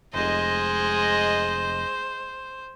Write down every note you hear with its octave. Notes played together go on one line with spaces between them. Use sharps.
F1 G#3 C5 D#5